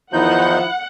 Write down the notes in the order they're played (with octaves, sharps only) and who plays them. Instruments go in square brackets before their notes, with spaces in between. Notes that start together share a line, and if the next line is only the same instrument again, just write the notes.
[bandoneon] E2 D#4 G6 [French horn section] D#3 F3 [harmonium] E4 [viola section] F#5